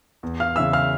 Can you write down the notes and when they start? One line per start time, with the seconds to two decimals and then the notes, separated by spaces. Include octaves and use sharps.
0.23 E2
0.40 F5 F6
0.56 C#3 E3 E5 E6
0.73 F5 F6